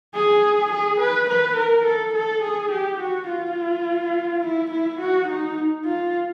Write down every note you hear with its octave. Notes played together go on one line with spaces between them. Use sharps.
G#4
G#4
B4
B4
A#4
A4
A4
G#4
G4
F#4
F4
E4
E4
F#4
D#4
F4